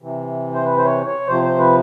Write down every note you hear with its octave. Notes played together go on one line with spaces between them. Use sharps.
C3 E3
C5
B4
C5
C#5
C#5
C3 F3 C5
C5
B4